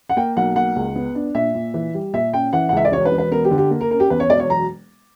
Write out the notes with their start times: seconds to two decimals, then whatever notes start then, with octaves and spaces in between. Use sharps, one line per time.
0.09 F#5
0.17 A#3 G5
0.37 B1 F#5
0.56 A#3 F#5
0.76 C#2
0.96 B3
1.15 D4
1.35 A#2 E5
1.55 A#2
1.74 E3
1.94 G3
2.13 A#2 E5
2.33 C#4 G5
2.53 E3 F#5
2.69 F#5
2.73 C#2 E5
2.85 D5
2.92 E1 C#5
3.05 B4
3.12 E1
3.18 B4
3.31 B3 A#4
3.45 G4
3.51 D3
3.58 G4
3.71 A#3
3.81 A#4
3.91 C#4 A#4
4.00 G4
4.10 E2 B4
4.20 C#5
4.30 E1 D5
4.40 C#5
4.50 F#3 A#5